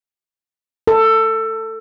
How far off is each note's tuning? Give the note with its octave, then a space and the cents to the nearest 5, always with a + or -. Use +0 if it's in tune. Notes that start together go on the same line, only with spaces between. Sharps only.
A4 +20